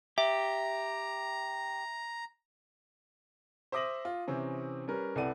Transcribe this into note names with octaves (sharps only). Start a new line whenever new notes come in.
G4 E5 A#5
C5 E5 D6 D#6 A#6 F#7
F4
C3 E3 C4 C#4
G3 C#4 A#4 B4
C2 A4 B4 D5 F#5 D#7